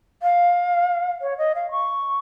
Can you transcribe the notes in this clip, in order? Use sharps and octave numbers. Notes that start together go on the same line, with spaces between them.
F5
C#5
D#5
F5
C#6